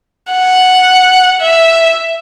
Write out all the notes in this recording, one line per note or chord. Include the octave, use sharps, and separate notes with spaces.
F#5
E5